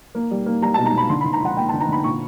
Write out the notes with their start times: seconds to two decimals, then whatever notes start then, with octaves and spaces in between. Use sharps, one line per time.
0.15 A#3
0.31 G3
0.46 A#3
0.62 G3 A#5
0.74 B2 A5
0.86 A#5
0.94 B2 B5
1.09 D3 C6
1.21 D3 B5
1.33 A#5
1.41 F3 F#5
1.57 A#3 G5
1.69 D3 A5
1.80 A#5
1.88 D3 B5
2.04 A#2 C#6